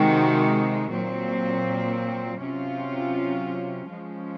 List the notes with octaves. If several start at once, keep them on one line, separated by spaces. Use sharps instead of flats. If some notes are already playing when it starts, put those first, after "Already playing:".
Already playing: C3 D#3 G#3 D#4 F#4
A#2 F#3 C4
C3 F#3 C#4 F4
F3 G#3 C#4